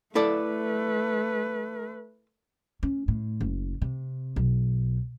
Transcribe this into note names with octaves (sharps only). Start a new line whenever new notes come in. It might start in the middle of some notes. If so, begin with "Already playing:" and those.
A3 E4 A4 B4 D5
C#4
A2
F#1
C3
B1